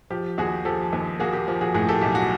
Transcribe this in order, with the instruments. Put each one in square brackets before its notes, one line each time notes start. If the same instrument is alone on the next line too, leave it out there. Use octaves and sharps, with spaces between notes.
[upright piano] F3 G4
D#2 F#4 G#4
F3 G4 A4
D#2
A#3 F#4 G#4
G4
F3
F#4 G#4
A2 F#4 G#4
G4 A4
B1 G4
F#4